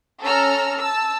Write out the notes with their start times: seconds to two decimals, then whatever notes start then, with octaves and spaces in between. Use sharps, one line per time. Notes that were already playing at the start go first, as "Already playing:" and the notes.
0.23 C#4 A4 A5 A#5 E6 F6
0.79 A5 E6